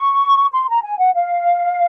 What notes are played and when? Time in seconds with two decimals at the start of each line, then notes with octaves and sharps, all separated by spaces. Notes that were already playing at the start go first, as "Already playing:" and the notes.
Already playing: C#6
0.52 C6
0.68 A#5
0.83 G#5
0.99 F#5
1.14 F5